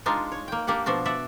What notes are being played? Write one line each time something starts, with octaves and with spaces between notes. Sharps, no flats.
G#3 D4 D#4 F4
C#5
A#3 G5
A#3 D4 G4 F#5
B2 F3 D4 F#4
D5 E5 F#5